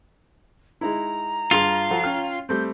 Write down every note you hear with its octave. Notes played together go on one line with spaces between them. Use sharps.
G#3 D#4 E4 A#5
G2 F4 G#4 C6
F3 F#4 A4
C#4 G5 F6
G3 A3 C4 G6